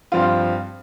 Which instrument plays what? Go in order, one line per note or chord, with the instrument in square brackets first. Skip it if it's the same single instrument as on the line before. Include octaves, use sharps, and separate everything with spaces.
[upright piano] G2 F3 C4 F4